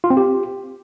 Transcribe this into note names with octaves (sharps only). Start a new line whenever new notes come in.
F4
C4
G4